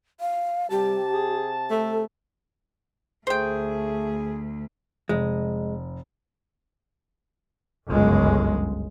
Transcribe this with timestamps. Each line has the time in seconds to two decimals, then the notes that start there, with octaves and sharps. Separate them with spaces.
0.20 F5
0.70 C3 G3 G4 A5
1.13 G#4
1.70 A3 A4
3.27 D2 A3 G#4 C5 G5
5.09 F1 G#3
7.88 G1 C#2 F#2 G#3